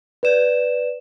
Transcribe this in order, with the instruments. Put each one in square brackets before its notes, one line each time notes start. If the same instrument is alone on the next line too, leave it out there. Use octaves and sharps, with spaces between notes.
[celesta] B4 D5 E7